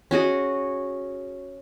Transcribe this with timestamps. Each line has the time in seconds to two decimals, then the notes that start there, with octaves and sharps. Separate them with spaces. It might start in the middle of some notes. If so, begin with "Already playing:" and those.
0.11 C#4 F#4 G#4 D#5